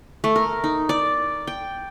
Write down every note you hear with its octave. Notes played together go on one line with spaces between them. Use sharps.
A3
A#4
D#4
D5
G5